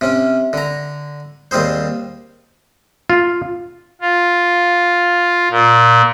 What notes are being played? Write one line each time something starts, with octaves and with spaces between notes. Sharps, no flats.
C3 C#4
D3 A#5
D#2 G3 C4 G#4 C5
F4
F4
A#2